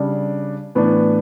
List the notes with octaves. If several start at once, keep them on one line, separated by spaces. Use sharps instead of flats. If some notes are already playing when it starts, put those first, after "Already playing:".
Already playing: C#3 G3 D4
A2 E3 B3 D4